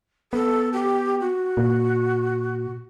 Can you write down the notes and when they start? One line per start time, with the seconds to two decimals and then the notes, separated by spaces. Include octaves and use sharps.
0.33 B3 A4
0.73 G4
1.20 F#4
1.57 A#2